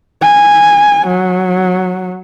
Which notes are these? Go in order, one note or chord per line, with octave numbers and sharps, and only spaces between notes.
G#5
F#3